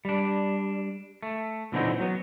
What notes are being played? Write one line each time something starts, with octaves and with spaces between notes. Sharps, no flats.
G3 D4
A3
A#2 D3 E3 F#3 C4 D#4
F#3 B3